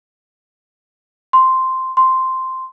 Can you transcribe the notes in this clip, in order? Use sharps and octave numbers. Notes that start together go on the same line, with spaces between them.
C6
C6